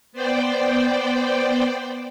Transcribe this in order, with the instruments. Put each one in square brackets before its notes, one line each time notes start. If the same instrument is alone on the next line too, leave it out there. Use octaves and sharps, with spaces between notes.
[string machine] B3 C5 D5 G5